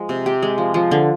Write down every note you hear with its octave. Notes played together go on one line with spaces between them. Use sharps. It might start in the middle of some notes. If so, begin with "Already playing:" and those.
Already playing: F3 G#3
C3
G4
G#3
F3
F3
D3